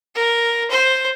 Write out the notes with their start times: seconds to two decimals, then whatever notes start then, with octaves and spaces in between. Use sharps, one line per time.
0.15 A#4
0.70 C5